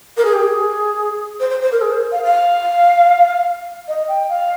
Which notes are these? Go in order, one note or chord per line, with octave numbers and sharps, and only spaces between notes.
A#4
G#4
G4
G#4
C5
C5
C5
A#4
G#4
C5
F5
F5
D#5
G5
F5